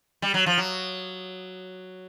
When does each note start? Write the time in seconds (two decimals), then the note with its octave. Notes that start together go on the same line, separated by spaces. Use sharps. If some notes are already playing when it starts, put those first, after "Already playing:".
0.22 G3
0.34 F#3
0.46 F3
0.58 F#3